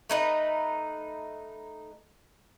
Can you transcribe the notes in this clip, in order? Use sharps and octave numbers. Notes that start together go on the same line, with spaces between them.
A3 D#4 B4